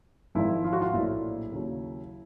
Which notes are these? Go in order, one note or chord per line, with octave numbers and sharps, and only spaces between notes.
G#1 G#2 F3 E4
F4
F#4
F4
A#1 A2 F#3 E4
D#2 C#3 F#3